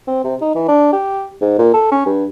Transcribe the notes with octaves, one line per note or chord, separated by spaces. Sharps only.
C4
C3
D#4
E3
D4
G4
G#2
A#2
A4
C#4
G2